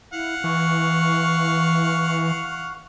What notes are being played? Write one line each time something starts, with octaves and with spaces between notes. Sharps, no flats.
E4 F5 F#5
E3 C#6